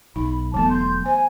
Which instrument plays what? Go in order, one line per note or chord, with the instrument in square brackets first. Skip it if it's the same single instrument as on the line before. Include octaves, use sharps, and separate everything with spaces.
[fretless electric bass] B1 [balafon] D#4 [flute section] B5
[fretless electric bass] E1 F#3 A3 [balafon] E3 B3 [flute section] A5
[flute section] C6 G6
[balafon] C5 [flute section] G#5